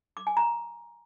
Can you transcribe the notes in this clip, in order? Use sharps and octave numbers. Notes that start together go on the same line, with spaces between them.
D6
G#5
A#5